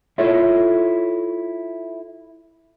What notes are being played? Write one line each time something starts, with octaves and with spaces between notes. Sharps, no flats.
E4 F4 A4 C#5